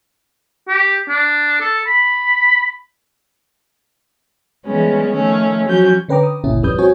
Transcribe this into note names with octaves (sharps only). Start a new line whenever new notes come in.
G4
D4
A4
B5
E3 G3 G#3 B3 C#4
D#3 F3 A3 C#4
F3 F#3 C#4 F#4 G6
D3 C#4 B4 G5 A#5 D6
D#6
G1 C#2 A#2 C#4 E4
F2 G3 C#4 B4 D#6 G6
C4 C#4 F#4 C#5 G#5